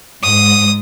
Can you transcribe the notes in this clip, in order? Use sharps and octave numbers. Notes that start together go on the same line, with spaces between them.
G#2 D#6